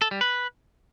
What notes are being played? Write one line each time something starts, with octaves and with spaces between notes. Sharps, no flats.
A4
G3
B4